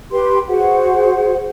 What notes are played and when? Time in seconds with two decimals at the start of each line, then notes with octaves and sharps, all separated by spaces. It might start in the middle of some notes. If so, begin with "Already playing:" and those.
0.11 G4 B4 G5 C6
0.48 F#4 G#4 C5 F#5